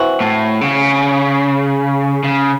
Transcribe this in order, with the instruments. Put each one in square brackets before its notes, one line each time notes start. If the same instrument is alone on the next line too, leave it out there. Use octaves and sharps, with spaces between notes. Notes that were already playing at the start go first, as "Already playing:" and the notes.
Already playing: [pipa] E3 C4 F#4
[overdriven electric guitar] A2
C#3
C#3